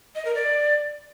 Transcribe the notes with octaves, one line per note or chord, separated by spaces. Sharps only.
D#5
A#4
D5